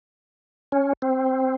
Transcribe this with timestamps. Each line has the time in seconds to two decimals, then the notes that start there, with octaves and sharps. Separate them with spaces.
0.72 C#4
1.02 C4